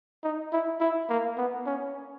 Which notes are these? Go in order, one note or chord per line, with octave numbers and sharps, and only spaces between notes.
D#4
E4
E4
A#3
B3
C#4